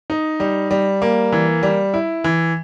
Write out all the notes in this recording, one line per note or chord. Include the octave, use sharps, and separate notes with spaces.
D#4
G3
G3
A#3
E3
G3
E4
E3